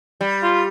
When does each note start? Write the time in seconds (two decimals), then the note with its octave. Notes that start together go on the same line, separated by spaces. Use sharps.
0.21 G3
0.43 F4